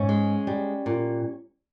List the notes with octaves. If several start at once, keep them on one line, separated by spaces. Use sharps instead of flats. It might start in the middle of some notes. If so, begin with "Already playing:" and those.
Already playing: G#2 C#4 C#5
G#3
G3
A#2